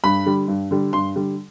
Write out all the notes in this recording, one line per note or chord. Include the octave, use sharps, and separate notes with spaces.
G2 B5
D3 G3
G2
D3 G3
G2 C6
D3 G3